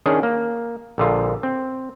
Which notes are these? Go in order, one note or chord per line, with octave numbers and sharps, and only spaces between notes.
D#3 C#4 D4 G#4
A#3
A#1 D3 F4
C4